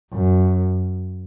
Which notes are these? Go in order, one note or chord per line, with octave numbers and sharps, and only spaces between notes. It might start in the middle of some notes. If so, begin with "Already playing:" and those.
F#2